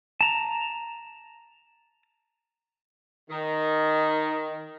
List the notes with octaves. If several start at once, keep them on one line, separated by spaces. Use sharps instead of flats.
A5 A#5
D#3